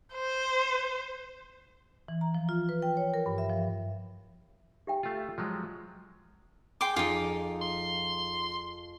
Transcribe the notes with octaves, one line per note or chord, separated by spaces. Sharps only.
C5
E3
A#5
F3
F4
B4
G5
C#5
A#4
G2
E5
F3
G4 E5 G5
A3 F4
F3 F#3 G#3
G#4 G5 C6 D6
F2 D#4 F4
C6